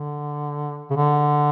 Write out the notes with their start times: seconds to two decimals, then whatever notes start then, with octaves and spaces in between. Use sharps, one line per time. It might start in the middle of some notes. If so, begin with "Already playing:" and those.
Already playing: D3
0.91 C#3
0.96 D3